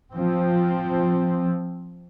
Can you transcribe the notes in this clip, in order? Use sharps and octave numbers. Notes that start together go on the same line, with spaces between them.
F3 C4